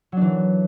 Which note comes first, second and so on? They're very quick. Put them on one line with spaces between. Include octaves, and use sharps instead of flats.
F#3 D4 E3